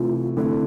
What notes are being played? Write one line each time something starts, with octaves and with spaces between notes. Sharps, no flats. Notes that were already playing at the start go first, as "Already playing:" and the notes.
Already playing: C3 E3 A3 E4 F4
D3 A3 C4 E4